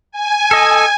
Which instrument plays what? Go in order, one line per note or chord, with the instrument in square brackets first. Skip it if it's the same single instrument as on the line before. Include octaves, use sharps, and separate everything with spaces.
[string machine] G#5
[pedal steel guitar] A4 D#5